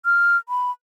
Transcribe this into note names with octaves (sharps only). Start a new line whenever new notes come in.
F6
B5